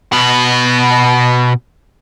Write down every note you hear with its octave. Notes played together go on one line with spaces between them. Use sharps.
B2 B4